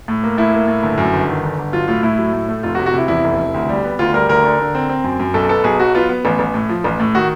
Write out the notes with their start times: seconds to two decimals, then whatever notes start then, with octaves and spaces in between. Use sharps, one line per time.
0.08 A2
0.24 A#3
0.38 A2 E4
0.54 A#3
0.68 A2
0.83 G1
0.98 F#2
1.13 G1
1.28 D#3
1.43 G1
1.58 G1
1.73 F#3 F4
1.88 A2 F4
2.03 A2 E4
2.18 F#3
2.33 A2
2.49 A3
2.63 F1 F4
2.75 F#4
2.78 C3
2.86 F#4
2.93 C3 E4
3.08 E2 E4
3.24 F1
3.38 F1
3.54 D2
3.69 G3
3.84 B3
3.99 D2 F4
4.13 G3 A#4
4.29 D2 A#4
4.44 D3
4.59 D3
4.75 C4
4.89 C4
5.04 F#2
5.19 F#2
5.34 B1 A4
5.49 B3 A4
5.64 B1 G#4
5.79 F#3 F#4
5.94 B3 F4
6.09 B3
6.25 A1
6.39 A1
6.54 A2
6.69 F3
6.84 A1
7.00 A2
7.15 D#3 F#4